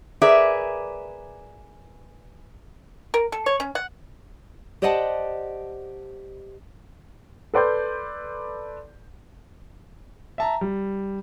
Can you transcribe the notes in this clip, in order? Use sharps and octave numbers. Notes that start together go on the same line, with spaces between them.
G#4 A#4 B4 D5 E5
A#4
A4
C#5
C#4
F#5
G4 C5 D5 D#5 F#5 A5
A4 B4 D5 C6 G6
E5 A5 A#5
G3